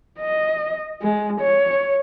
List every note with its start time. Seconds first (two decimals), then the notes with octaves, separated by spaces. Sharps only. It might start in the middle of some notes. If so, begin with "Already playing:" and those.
0.20 D#5
1.02 G#3
1.41 C#5